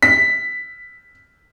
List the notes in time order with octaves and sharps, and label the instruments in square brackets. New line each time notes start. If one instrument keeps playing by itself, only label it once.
[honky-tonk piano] B6